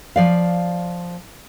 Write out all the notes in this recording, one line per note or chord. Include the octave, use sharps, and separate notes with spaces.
F3 D5 F5